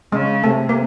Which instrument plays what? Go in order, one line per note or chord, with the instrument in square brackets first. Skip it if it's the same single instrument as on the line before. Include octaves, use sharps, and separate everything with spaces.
[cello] C#3 [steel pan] G#3
[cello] C3 [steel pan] A3
[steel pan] A#3